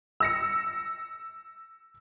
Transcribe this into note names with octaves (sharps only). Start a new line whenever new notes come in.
E6 A#6 C#7